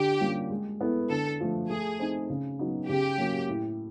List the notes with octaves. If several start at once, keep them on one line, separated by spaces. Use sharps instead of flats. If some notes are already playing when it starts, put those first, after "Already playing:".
Already playing: D3 G4
G3 A#3 C#4 F4
G#3
B3 E4 A4
D3 A4
F3 A3
A3 G#4
C4 D#4
C#3
F#3 B3 D#4 F#4
C#3 G4
F#3 A#3 C#4
A2